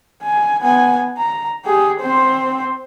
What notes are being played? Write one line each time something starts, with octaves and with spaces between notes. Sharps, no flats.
G#5
B3 G#5
A#5
G4 G#4
C4 C5